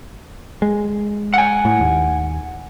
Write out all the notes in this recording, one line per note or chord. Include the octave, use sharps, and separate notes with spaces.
G#3
F#5 G#5
A2
D#2